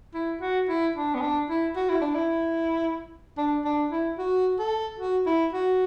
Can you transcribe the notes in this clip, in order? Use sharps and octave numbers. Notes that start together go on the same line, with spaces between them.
E4
F#4
E4
D4
B3
D4
E4
F#4
E4
D4
E4
D4
D4
E4
F#4
A4
F#4
E4
F#4